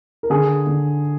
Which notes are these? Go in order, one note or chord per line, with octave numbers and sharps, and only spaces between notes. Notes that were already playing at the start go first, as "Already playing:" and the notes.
A#4
D3 G#4
D3